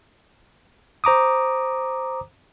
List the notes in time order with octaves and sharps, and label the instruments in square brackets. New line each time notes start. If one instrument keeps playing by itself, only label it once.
[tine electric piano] C5 A#5 D6 D#6